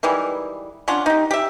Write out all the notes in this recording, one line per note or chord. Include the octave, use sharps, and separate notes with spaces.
D#3 E3 G3 G#3
C#4 D4 F4 F#5
D#4 G4
G4 E5